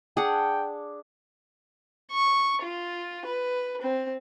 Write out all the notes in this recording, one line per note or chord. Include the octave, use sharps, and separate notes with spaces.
D4 G#4 F#5 G5
C#6
F4
B4
C4